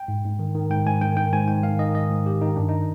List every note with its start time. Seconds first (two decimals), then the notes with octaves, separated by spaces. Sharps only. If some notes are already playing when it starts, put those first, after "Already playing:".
Already playing: G5
0.08 G#2
0.24 G#2
0.39 D#3
0.55 D#3
0.70 G#2 G5
0.87 G#2 G#5
1.01 D#3 G5
1.17 D#3 G5
1.33 G#2 G#5
1.48 G#2 G5
1.63 D#3 F5
1.79 D#3 D#5
1.95 G#2 D#5
2.10 G#2
2.26 D#3 G4
2.41 D#3 D#4
2.57 G2 D4
2.69 D#4